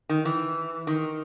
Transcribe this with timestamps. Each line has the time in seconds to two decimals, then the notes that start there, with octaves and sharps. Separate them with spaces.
0.09 D#3
0.25 E3
0.87 D#3